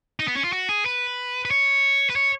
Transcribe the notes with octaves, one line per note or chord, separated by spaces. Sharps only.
D#4
B3
C#4
F4
F#4
G#4
B4
B4
C#5
B4
C#5